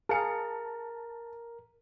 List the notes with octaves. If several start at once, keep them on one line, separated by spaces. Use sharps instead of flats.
G#4 A#4 F5 A5 C#7